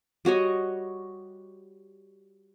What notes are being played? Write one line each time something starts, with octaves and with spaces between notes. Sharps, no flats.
G3 F#4 C#5 D#5